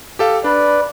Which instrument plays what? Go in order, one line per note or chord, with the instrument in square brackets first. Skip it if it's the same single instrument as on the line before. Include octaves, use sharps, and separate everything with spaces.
[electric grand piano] G4 A4 F5
[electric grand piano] D4 [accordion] B4 D5